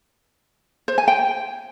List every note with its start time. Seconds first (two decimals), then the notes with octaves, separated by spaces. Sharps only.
0.88 C5
0.98 G#5
1.08 G5